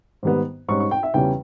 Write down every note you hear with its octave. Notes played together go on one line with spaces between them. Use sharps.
G#2 D#3 G3 B3
G#2 G3 C#4 C#6
C#6
G5
E5
E2 C#3 E3 G3 C#4 G5